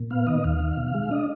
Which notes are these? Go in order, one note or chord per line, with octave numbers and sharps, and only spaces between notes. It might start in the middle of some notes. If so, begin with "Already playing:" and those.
Already playing: A#2
B3 F5
D#3 D#5
D#2 F5
D#3
B2
G#3
D4 D#5